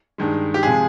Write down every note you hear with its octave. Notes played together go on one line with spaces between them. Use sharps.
G2 D#3 G#3
G4
C3 F3 G#3 G#4